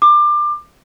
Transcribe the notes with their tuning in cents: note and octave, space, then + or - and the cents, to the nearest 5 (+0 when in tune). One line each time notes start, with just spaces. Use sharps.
D6 +25